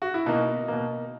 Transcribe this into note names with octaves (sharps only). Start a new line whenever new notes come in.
F#4
E4
B2 A#3 D#4
B2 A#3